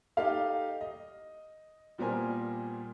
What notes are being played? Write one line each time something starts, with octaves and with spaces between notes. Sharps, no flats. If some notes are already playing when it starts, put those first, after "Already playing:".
D#4 G4 A4 F5
D#5
A#2 G3 B3 A#4 C5 G#5